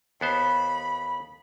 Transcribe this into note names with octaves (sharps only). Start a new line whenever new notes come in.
D#2 B3 C5 B5